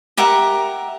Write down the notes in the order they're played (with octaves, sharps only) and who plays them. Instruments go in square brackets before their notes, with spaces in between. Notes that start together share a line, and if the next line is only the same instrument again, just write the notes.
[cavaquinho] G4 A#4 E5 F#5